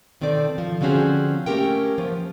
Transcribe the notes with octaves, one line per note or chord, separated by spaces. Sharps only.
B2 D#3 C4 A4 D5
F3
D3 F3 C4 C#4 F#4 G#4
A3 A#3 C#4 G4 A#4 G5
F3 B3